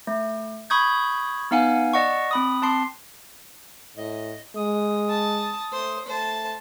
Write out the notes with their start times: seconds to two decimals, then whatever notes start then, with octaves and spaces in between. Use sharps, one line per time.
0.07 A3
0.70 B5 C#6 D#6 G6 G#6
1.51 B3 D#4 F5 F#5 G#5
1.94 D5 D#5 F#5 C#6
2.31 C4 B5 D#6
2.62 C4 A5 C6 C7
3.96 A2 D#5
4.56 G#3 D#6
5.09 A5
5.72 A3 C5
6.07 A3 C5 A5